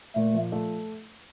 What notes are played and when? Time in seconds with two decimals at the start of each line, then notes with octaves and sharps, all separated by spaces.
0.16 A#2 A3
0.34 F3
0.52 A3